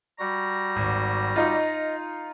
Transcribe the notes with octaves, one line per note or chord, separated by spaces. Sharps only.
G3 F#4 A#5
G#1
D#4 F4 D#5